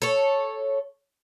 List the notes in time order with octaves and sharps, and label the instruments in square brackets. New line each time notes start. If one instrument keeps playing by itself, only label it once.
[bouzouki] A4 C#5